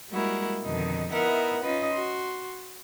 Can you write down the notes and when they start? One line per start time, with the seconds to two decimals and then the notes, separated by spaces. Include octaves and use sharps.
0.10 G3 G#3 A#3 E4 F#4 A#4
0.64 F2 B2 D3 D#3 D#4
1.11 B3 D#4 E4 A#4 E5 F#5
1.62 C#4 D#4 F4 B4 D#5
1.92 F#4 C6